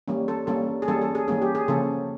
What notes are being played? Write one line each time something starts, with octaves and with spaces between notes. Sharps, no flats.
E3 G3 A#3 C#4
A4
E3 G3 A#3 C#4 A4
G#4
E3 G3 A#3 C#4 A4
A4
G#4
E3 G3 A#3 C#4 G#4
G4
G#4
C#3 F3 A#3 C#4 A4